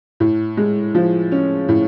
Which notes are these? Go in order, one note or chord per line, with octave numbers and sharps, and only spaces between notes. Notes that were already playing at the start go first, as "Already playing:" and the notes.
A2
G#3
F3
C#4
A2